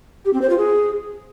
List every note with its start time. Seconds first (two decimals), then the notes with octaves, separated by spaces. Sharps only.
0.25 G4
0.33 C4
0.42 C5
0.50 F4
0.58 G#4